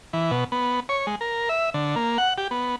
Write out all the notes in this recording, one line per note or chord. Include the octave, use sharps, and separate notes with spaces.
E3
B2
B3
C#5
G#3
A#4
E5
D3
A#3
F#5
G4
B3